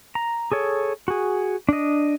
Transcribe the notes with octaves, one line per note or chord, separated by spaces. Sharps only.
A#5
G#4 A4 C#5
F#4 G#4
D4 D#5